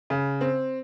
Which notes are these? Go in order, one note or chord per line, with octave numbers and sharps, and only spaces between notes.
C#3
C4